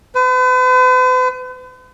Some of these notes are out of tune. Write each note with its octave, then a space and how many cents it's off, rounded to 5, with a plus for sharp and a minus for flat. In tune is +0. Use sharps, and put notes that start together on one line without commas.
B4 +45